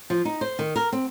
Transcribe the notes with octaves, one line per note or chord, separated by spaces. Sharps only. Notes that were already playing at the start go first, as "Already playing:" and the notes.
F3
D#4
C5
D#3
A#4
C4